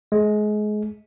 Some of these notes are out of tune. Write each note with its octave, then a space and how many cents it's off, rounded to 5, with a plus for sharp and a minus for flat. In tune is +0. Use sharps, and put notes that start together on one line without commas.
G#3 +25